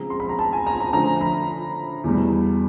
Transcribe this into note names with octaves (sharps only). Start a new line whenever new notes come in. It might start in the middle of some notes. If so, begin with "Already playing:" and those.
Already playing: C#3 F3 G#3 C4 A#5
C6
B5
A#5
A5
G#5
A#5
A#5
D3 F3 A3 C#4 A#5
B5
E2 B2 G3